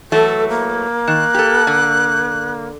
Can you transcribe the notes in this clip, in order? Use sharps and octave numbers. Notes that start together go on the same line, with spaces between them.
E3 F#3 A3 A4
A#3
D#3 F#6
G4 A4
D3